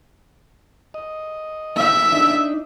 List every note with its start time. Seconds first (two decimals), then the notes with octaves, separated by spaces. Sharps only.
0.94 D#5
1.77 E5
2.12 D4 D#4